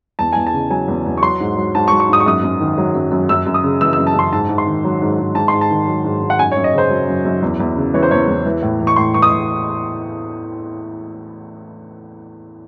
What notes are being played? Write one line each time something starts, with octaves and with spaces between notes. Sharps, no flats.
E2 A5
E2 G#5
A5
C#3
F#3 G#5
E2
E2
C#6
F#3 C6
G#2
F#3
G#2 A5
C#6
F#3
C#6
G#2 D#6
C#6
F#2 D#6
F#2
D#3
F#3
F#2
F#2
F#2 E6
F#2
D#6
C#3
E3 E6
E6
F#2
A5
F#2 C6
G#2 A5
G#2
C6
D#3
F#3
G#2
G#2
G#2 A5
C6
G#2
A5
D#3
F#3
G#2
G#2
F#5
F#2 G#5
C#5
F#2
D#5
C#3 C5
F#3
F#2
F#2
E2
E2
C#3
E3 C#5
C5
E2 C#5
E2
E3
A2
E3
C#6
A2 C6
E3 C#6
D#6
A2